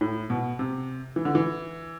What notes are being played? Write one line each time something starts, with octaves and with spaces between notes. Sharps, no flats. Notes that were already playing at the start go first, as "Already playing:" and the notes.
A2
B2
C3
E3
D3
E3